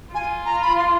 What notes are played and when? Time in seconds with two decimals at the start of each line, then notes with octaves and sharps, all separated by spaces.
0.14 F4 G#5
0.46 A#5
0.62 B5
0.77 C6